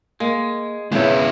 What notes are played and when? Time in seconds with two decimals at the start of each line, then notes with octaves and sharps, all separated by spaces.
0.20 G#3 A#3
0.92 E2 C#3 G#3 C#4 E4